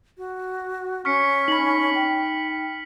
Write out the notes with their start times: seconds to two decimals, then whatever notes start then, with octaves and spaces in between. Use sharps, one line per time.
0.18 F#4
1.05 C#4 C#6 F6 B6 C#7
1.48 D#4 B5 B6 F#7
1.95 G5